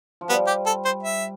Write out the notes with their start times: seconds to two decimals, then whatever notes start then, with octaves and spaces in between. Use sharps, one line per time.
0.21 F3
0.29 G3 B3
0.47 G4
0.66 A4
0.85 C5
1.03 E5